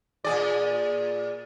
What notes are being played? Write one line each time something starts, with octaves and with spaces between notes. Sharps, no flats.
A#2 G#4 D5